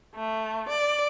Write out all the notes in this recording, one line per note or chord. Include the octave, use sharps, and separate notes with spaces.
A3
D5